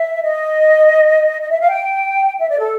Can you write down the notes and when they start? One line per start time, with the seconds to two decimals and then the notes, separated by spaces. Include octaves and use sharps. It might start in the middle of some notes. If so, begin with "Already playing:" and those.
Already playing: E5
0.23 D#5
1.41 D#5
1.50 E5
1.60 F5
1.70 G5
2.39 E5
2.49 D5
2.59 A4